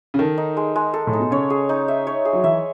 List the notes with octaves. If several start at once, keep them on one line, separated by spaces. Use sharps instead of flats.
C#3
D#3 A4
D#4
G#3
G#3
A4
A2
D#4
B2
C#3 C#5
G#4
D#4
E5
C#5
G#4
F#3
E3 E5